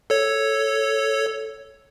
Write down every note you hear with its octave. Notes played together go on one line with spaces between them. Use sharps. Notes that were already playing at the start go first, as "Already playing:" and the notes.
A4 C#5